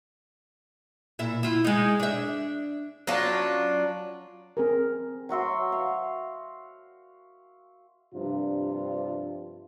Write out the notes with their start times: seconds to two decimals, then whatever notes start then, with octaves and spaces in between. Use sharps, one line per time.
1.19 A#2 E4 E5
1.43 E4 F4
1.64 G#3 D#4
2.00 D4 E5
3.07 F#3 C#4 D4 F4
4.57 C4 G#4 A#4
5.29 F#3 F#4 E5 C6
5.72 F5
8.14 G2 C3 F3 D4 F4